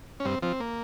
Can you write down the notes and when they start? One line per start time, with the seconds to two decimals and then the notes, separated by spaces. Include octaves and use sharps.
0.20 C#4
0.25 G2 C4
0.42 F3 C4
0.60 A#3